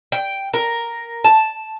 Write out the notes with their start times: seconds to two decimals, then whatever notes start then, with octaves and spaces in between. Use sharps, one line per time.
0.12 G5
0.54 A#4
1.24 A5